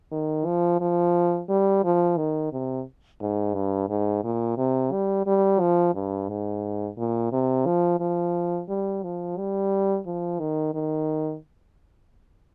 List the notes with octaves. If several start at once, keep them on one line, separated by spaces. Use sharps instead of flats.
D#3
F3
F3
G3
F3
D#3
C3
G#2
G2
G#2
A#2
C3
G3
G3
F3
G2
G#2
A#2
C3
F3
F3
G3
F3
G3
F3
D#3
D#3